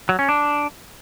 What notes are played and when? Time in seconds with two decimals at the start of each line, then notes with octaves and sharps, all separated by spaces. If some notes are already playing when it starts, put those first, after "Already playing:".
0.09 F#3
0.19 C#4
0.29 D4